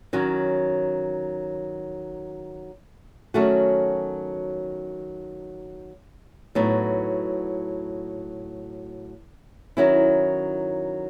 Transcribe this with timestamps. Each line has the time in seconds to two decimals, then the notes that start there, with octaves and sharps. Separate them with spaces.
0.13 D#3 F#3 C#4 F#4
3.34 D#3 F#3 A3 C#4 F#4
6.55 A2 F#3 B3 D#4 F#4
9.77 D#3 F#3 C#4 E4